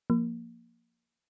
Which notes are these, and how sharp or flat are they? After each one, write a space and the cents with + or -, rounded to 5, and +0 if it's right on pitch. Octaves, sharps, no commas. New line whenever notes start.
F3 +0 A#3 +0